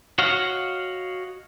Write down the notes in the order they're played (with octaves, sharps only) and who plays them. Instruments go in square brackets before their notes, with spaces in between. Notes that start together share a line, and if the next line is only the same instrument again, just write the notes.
[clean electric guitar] F#4 C#5 D#5 F5 F#5